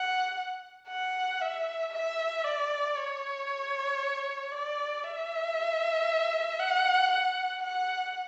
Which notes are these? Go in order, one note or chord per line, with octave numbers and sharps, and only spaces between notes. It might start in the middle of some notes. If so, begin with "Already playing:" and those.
Already playing: F#5
F#5
E5
E5
D5
C#5
D5
E5
F#5
F#5
F#5